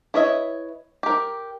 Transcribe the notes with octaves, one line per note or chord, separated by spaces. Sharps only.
E4 B4 C#5 D#5 E5
G4 A#4